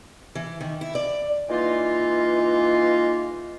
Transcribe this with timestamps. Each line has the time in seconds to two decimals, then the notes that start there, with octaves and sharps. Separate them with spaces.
0.35 E3
0.60 D#3
0.81 E4
0.95 D5
1.49 E3 G#3 A#3 D#4 F4